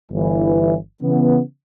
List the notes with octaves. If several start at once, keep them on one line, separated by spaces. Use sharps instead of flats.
G1 E3
C#3 E3 B3